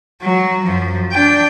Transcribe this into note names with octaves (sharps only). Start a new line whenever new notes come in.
F#3
F#2 F3
D4 G5